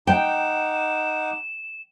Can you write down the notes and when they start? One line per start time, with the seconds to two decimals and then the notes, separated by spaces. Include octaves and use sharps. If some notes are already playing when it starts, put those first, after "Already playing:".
0.07 D#4 F#5 G5 D6 E7